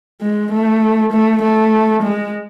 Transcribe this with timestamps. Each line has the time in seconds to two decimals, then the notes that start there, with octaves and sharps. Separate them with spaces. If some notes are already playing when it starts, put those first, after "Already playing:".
0.22 G#3
0.52 A3
1.12 A3
1.42 A3
2.03 G#3